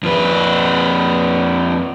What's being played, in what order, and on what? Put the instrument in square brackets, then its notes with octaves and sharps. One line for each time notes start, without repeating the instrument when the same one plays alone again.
[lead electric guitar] F2 B4